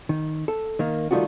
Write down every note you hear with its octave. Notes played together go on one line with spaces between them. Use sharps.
D#3
A4
D#3 A#3
D#3 G3 A3 D#4 F4 F#4